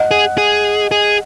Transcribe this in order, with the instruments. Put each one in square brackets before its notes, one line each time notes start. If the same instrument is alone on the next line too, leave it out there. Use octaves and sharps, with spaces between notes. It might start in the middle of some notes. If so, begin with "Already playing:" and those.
Already playing: [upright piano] D#5 F#5
[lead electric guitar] G#4
G#4
G#4